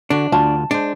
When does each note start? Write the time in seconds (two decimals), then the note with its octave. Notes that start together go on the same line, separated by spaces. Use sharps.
0.10 D3 D4 F#4
0.32 D2 F4 F#4 A5
0.71 G#3 D4 C5